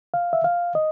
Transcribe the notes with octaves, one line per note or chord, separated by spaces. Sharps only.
F5
E5
F5
D#5